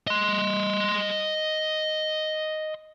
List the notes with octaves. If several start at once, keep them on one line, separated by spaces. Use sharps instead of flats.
D#5 C6